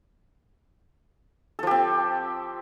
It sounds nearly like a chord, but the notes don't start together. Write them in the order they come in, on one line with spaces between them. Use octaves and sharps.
A4 F3 G4 C4